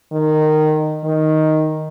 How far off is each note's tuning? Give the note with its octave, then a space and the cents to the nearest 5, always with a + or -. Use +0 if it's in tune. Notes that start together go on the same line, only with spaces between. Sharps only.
D#3 -15
D#3 +0